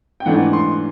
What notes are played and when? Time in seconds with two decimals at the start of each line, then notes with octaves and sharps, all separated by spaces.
0.20 G5
0.26 G#2 E3 A3 D4 F#5
0.53 C6